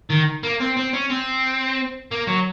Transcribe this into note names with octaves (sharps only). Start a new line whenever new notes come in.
D#3
A#3
C4
C4
C#4
C4
A#3
F#3